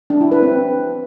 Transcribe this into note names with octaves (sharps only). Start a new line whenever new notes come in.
D4
E4
B4
C4